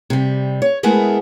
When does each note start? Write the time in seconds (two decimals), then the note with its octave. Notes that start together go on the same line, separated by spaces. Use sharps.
0.10 C3 G3
0.62 C#5
0.83 G#3 A3 B3 E4 G#4 A#4